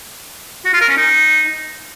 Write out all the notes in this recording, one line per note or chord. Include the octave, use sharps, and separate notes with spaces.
F#4
F4
A#4
C#4
D#4